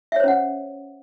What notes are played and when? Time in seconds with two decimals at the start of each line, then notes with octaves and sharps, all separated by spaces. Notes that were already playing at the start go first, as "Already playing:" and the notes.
0.12 E5
0.16 C#5
0.20 C5
0.24 C#4
0.28 F#5